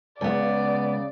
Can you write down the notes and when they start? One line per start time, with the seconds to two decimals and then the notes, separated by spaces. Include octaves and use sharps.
0.21 C#2 C#3 B3 C#5 D5